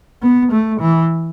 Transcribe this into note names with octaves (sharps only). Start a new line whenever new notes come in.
B3
A3
E3